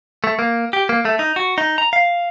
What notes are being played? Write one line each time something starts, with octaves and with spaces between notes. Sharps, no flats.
A3
A#3
G4
A#3
A3
D#4
F#4
D#4
A#5
F5